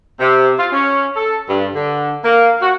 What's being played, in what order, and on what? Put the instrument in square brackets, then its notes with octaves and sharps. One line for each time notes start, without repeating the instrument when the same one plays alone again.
[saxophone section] C3
F4
C#4
A4
G2
D3
A#3
F#4